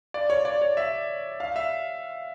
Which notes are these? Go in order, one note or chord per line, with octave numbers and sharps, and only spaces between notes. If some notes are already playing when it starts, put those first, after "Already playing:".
D5
C#5
D5
C#5
E5
F5
E5